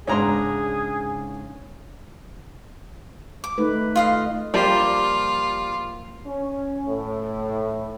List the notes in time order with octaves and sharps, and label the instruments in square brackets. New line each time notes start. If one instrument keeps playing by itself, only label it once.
[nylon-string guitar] G#2 C#3 D4 [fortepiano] C#4 A#5 C6 [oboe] G#4
[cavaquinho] D6
[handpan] A3 D#4 B4
[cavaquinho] F4 D#5 F5
[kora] F3 A#3 G4 [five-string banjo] G3 [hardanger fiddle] F4
[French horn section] C#4
A2